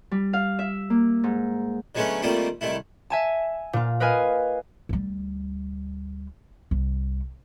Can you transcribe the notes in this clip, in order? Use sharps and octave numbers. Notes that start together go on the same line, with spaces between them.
G3
F5
E5
A#3
G#2
D3 F#3 G#3 A3 B3 C#4
D#3 G3 A3 A#3 C4 F4
C2 D#3 A3 E4
E5 G#5 A5
A#2 F4
A#4 B4 D#5 F5 G#5
D2 G3
C2